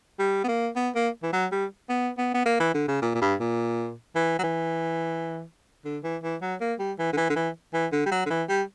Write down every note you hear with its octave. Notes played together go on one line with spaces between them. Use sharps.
G3
B3
A#3
B3
A#3
E3
F#3
G3
B3
B3
B3
A#3
E3
D3
C#3
A#2
A#2
G2
A#2
E3
F#3
E3
D3
E3
E3
F#3
A#3
G3
E3
D3
E3
D3
E3
E3
D3
G3
F#3
D3
E3
G3